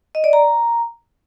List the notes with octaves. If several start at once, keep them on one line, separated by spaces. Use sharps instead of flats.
D#5
D5
A#5